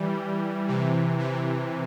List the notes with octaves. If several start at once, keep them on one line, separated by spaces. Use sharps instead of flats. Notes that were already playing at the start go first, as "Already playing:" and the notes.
Already playing: E3 G3
C3 E3
C3 E3